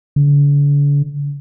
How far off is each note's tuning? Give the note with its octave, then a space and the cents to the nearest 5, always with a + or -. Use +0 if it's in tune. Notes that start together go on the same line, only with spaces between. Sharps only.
D3 -40